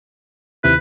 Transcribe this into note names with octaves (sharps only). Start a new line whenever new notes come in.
D#2 C3 E4 B4